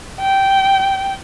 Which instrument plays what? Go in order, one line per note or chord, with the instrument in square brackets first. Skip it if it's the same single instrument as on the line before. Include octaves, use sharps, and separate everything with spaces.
[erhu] G5